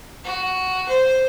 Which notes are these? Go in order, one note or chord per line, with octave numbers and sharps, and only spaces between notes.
F#4
C5